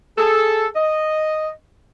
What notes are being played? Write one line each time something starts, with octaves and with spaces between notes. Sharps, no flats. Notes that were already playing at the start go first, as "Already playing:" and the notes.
G#4 A4
D#5